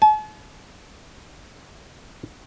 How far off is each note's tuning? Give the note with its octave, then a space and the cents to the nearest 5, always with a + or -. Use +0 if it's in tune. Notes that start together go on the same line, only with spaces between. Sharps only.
A5 -45